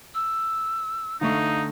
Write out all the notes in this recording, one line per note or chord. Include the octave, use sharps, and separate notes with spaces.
E6
D3 A3 D#4 F5 C#6